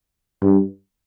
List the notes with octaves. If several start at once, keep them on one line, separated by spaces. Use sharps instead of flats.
G2